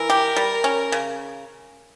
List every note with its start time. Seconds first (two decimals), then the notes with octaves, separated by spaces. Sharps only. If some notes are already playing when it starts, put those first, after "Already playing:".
Already playing: E3 A#4
0.10 G4
0.36 G3
0.64 C#4
0.92 C#3